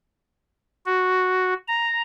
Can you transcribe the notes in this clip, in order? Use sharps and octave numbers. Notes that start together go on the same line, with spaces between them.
F#4
A#5